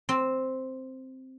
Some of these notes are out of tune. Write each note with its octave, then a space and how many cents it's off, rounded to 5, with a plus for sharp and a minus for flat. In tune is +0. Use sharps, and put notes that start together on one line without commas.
C4 +0